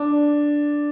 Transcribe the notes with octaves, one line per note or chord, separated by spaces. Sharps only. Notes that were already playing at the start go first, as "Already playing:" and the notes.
Already playing: D4